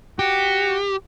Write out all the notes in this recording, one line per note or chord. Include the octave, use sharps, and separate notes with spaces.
F#4 G4